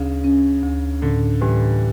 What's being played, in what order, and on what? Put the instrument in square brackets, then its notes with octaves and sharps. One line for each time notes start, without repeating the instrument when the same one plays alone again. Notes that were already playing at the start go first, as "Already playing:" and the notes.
Already playing: [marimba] D2 [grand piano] C#3
[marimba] C#4
D2
[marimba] A2 [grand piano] D3
[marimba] A2 [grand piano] E3 G3